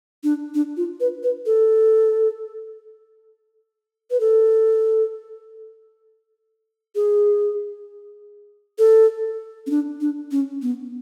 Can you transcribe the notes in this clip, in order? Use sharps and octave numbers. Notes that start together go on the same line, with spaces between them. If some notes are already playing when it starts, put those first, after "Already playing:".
D4
D4
F4
B4
B4
A4
B4
A4
G#4
A4
C#4
D4
D4
C#4
B3